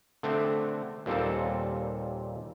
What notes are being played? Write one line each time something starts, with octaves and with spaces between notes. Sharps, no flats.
D3 A3 C4
D#2 A#2 G3 C4 A4